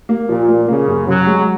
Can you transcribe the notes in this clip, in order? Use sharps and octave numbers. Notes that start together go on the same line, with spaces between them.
A#3
A#2 F3
A#3
C#3 A#3
F#2
C#3 F#3
G#3